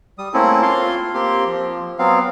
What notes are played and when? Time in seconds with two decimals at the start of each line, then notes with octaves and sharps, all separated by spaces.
0.18 G3 D#6
0.34 A3 A#3 C4 C#4 E4 A4
0.63 F4 F5 C6
1.14 A#3 C4 G4 C6
1.46 F3
1.99 F#3 B3 C4 F5